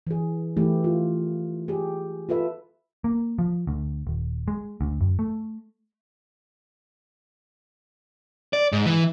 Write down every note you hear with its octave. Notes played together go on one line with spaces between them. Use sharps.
E3 G#4
E3 A3 E4 G4
F4
G4 G#4
F4 A4 B4 E5
A#3
F3
D2
D#1
G#3
D2
F#2
A3
D5
G#2
E3